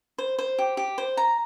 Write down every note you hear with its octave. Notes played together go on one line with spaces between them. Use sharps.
C5
C5
G4
G4
C5
A#5